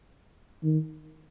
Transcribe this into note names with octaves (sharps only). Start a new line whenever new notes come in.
D#3